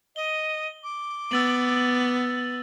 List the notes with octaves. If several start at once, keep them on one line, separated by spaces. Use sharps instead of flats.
D#5 G7
D6
B3 E6 A6 F#7